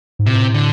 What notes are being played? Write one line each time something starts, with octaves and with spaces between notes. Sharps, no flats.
G#2
A2 C3
D3